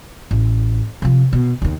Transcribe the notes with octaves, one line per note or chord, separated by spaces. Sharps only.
A1
C3 F3
B2
D#2 D#3